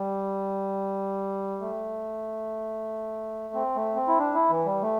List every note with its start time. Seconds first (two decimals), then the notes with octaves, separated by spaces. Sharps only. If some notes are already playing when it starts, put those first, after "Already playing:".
Already playing: G3
1.61 A3
3.54 C4
3.76 A3
3.96 C4
4.08 E4
4.19 D4
4.34 E4
4.50 E3
4.66 G3
4.82 A3